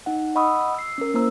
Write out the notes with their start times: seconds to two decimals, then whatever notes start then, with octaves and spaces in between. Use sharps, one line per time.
0.06 D#4 F#5
0.35 D#5 F#5 B5 C#6 D#6 E6
0.75 E6 C7
0.98 C#4 A#4
1.14 A#3 E4 C5 A#5 E6